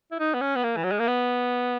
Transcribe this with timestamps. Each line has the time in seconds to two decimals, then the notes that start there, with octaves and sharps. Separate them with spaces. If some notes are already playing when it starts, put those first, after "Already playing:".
0.12 E4
0.20 D#4
0.34 B3
0.41 C#4
0.56 B3
0.64 A#3
0.77 E3
0.84 F#3
0.92 G#3
0.99 A#3
1.08 B3